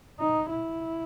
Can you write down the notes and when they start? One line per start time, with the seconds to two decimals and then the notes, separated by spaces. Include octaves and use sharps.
0.19 D#4
0.50 E4